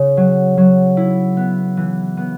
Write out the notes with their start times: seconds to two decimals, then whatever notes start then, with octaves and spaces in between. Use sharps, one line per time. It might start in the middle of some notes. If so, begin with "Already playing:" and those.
Already playing: C#3
0.17 F#3
0.57 F#3
0.97 E4
1.37 B3
1.77 E3
2.17 B3